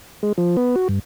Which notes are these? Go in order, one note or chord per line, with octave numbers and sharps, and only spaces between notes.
G#3
F3
B3
F#4
G2